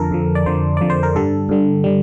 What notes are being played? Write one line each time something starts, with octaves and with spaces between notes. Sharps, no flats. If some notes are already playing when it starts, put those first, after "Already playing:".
Already playing: F2 D3 F3 A4 A#4
F2 D3 F3
D5
F2 D3 F3 C5
F2 D3 F3 D5
C5
A#4
G2 D3 G3 A4
G2 D3 G3
D3 G3